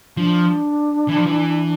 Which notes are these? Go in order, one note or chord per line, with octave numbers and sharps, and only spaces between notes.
F3 D4
E3
F3
E3